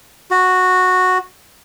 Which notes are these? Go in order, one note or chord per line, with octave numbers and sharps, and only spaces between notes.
F#4